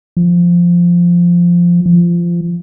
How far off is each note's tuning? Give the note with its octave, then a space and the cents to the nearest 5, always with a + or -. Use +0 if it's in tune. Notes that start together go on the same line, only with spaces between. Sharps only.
F3 -5
F3 -20